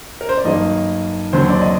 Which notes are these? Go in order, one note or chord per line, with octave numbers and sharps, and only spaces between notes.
A#4
C5
D5
G2 D#3 F#3 A#3 D#5
D#2 D3 F#3 C4 C5
D5
D#5